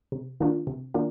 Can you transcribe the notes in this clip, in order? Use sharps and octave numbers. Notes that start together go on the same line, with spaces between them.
C3
D#3 A#3 D4 F4
C3
D#3 A#3 D4 F4